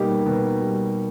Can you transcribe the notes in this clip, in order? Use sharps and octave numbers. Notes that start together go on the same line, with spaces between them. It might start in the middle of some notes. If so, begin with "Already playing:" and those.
Already playing: B2 G3 A#3 D#4 G4
B2
G3